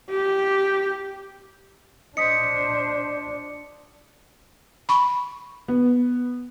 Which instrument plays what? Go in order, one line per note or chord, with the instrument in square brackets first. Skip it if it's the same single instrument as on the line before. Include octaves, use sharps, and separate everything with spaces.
[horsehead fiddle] G4
[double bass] D4 [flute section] C5 [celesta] D#5 D#6 B6 [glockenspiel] C#7
[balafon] B5 C#6
[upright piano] B3